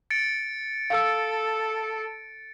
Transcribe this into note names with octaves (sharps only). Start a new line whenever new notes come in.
A6 C#7 D7
A4 F5 E6